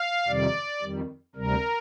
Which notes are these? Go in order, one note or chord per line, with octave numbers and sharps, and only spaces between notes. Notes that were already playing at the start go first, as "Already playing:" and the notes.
Already playing: F5
F2 C3 D#3 G3 D5
F2 D#3 G3
D2 C3 G3 A#4